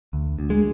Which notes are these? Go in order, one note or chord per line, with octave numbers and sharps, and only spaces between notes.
D2
D2
G#3